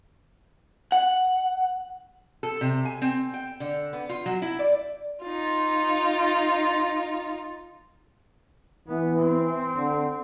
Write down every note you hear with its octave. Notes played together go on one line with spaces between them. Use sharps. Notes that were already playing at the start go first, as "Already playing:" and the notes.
F#5
A4
C3
G#5
C4
G5
D3
B3
F4
F#3
E4
D5
D#4 F4
E3 B3
C4
D3